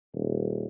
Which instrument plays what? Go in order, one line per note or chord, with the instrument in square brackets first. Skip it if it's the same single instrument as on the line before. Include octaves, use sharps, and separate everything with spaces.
[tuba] D#1